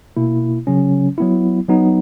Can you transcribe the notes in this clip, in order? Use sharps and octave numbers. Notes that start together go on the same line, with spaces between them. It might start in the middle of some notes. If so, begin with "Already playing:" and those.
B2 A#3 E4
C#3 F#3 C#4
F#3 B3 E4
F#3 B3 D#4